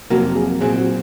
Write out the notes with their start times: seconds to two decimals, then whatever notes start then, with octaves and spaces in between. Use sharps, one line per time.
0.10 F2 C3 F#3 A#3 F#4 A#4
0.35 G#4
0.61 A#2 F#3 C4 G#4
0.78 F#4